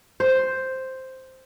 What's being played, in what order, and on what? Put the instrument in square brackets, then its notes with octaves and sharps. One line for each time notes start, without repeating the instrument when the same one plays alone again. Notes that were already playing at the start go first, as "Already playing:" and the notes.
[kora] C5